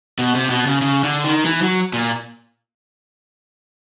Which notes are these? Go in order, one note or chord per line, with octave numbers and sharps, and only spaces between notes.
B2
C3
B2
C#3
C#3
D3
D#3
E3
F#3
A#2